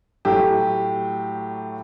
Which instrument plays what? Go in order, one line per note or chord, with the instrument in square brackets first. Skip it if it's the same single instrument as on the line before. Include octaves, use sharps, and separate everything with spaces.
[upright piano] A2 F#3 A3 G4